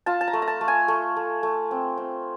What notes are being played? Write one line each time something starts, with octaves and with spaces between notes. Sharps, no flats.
F4 A5
A5
A#5
A3
A#5
A5
A3
G#5
A3
A3
A3
C4
C4